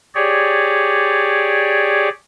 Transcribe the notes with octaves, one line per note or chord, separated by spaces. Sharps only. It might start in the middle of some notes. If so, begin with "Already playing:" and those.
G4 G#4 C#5 D5